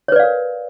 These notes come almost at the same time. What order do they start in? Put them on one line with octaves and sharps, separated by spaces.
C#5 B4 D5 F5 A#4